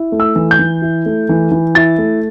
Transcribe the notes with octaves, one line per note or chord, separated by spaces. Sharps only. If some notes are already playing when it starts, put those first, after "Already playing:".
Already playing: E4
A3
E6
E3
G6
E3
E4
A3
E3
E3
E4 A6
A3